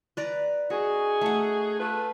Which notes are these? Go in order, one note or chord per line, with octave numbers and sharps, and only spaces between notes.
B4 D5 A#5
C#4 D#4 F#4 G#4
A3 F#5
A3 F4 B4